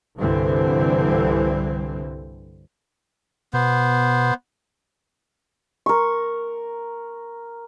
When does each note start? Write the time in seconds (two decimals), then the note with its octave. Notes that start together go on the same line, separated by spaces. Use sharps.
0.19 C2 G2 D3 E3 C4
3.54 B2 B3 C5
5.86 A#4 C#6